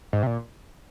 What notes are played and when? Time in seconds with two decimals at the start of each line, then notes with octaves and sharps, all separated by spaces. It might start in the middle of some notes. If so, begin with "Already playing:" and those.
0.13 G#2
0.23 C3
0.27 A#2